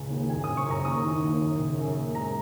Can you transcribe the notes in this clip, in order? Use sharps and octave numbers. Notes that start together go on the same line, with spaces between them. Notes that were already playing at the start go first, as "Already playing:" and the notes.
Already playing: C#2 C#3 C#4
D#2
F#2 G#5
D#6
C#3
C#6
F#2 A#5
D#2 D#6
D#3
D#2
F#2
C#3
F#2
A#2
G#3 A#5